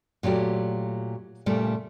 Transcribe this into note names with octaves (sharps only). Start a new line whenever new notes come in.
A#2 F#3 A3 G4
A#2 C#3 G3 A3